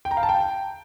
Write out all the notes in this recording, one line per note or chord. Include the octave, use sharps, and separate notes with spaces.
G5
A#5
F5
A5
G5